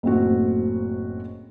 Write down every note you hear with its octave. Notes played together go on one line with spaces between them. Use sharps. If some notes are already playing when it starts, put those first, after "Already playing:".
F#1 A2 C4 F#4